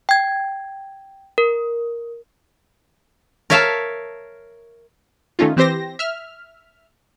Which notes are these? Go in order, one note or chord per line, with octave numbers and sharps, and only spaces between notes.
G5 G#6
A#4
A#4 C#5 E5 F5 A5
D#3 A3 C#4 D#4 F4
E3 C4 G4 C5 A#6
E5 F6